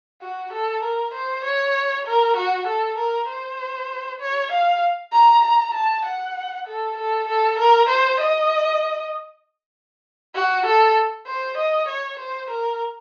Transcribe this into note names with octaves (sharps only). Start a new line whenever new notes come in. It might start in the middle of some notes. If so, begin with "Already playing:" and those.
F#4
A4
A#4
C5
C#5
A#4
F#4
A4
A#4
C5
C#5
F5
A#5
A#5
A5
F#5
A4
A4
A4
A#4
C5
D#5
F#4
A4
C5
D#5
C#5
C5
A#4